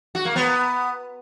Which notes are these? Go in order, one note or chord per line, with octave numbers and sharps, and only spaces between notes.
F#4
A#3
B3